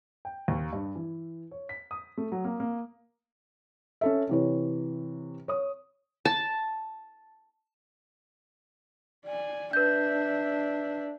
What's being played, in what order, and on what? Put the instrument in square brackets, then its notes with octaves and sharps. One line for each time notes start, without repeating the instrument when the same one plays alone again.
[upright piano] G5
D#2
G2
E3
C#5
B6
D#6
A3
F#3
A#3
A#3
[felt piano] C#4 A4 E5
C3 E3 C#5
C#5 D#6
[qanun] A5
[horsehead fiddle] D5 G#5
[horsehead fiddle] D4 E5 [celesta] B4 G6